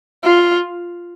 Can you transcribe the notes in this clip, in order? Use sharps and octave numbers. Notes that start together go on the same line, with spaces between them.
F4